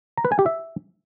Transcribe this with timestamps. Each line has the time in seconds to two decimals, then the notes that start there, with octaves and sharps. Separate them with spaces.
0.17 A#5
0.25 B4
0.32 G#5
0.39 G4
0.46 E5